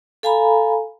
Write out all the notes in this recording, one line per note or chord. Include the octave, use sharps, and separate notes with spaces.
A4 F5 G#5 A#5 B5